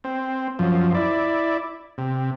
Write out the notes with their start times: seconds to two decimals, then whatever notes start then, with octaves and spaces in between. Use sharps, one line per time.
0.04 C4
0.59 F#2 F3
0.94 E4 D5
1.98 C3